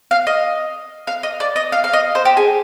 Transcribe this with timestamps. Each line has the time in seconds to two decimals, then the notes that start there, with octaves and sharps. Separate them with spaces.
0.11 F5
0.27 D#5
1.07 F5
1.23 D#5
1.40 D5
1.56 D#5
1.72 F5
1.84 F5
1.93 D#5
2.15 C5
2.25 G4
2.37 G#4